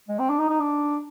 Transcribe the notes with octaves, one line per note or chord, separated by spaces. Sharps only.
G#3
C4
D4
D#4
D#4
D4